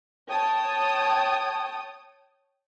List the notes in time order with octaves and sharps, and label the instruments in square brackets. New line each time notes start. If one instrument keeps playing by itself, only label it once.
[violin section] C#5 G5 A5 D#6